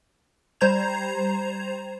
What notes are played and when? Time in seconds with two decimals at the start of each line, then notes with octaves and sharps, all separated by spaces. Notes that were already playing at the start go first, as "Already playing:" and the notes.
0.61 G3 C5 A#5 G6 G#6 F7